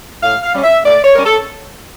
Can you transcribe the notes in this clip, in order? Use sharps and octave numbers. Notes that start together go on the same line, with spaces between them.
A2 F5
F5
G3 C#4
E5
A2 D5
C#5
G3 C#4 A#4
A4